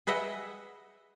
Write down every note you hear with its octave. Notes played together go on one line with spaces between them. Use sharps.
G#4 B4 D#5 E5 F#5 G5